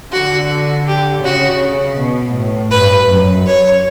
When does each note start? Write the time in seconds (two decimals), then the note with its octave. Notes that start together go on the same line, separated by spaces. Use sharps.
0.12 D3 F#4
0.87 G4
1.24 C#3 F#4
1.97 B2
2.35 A2
2.71 G2 B4
3.09 F#2
3.46 C#5